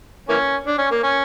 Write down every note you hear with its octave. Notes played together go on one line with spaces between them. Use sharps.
E3 A#3 C#4
D4
C#4
A#3
C#4